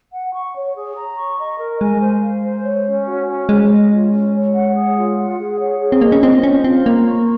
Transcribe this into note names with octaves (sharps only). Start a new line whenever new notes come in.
F#5
C#6
C#5
G#4
A#5
C#6
D#5
A#4
G#3 G#5
C5
F5
C5
C#5
C#4
F#4
C#4
G#3 C5
D#5
F4
C#4
C#5
F#5
G#4
F4
F#5
G#4
C#5
G#4
C4
A#3 D#5
C#4
C4 F4
C#4 C5
C4 F4
A#3 A#5
C#6